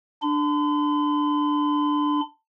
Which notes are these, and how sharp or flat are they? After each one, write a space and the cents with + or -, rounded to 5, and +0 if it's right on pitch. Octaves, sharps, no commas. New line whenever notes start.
D4 +10 C6 -45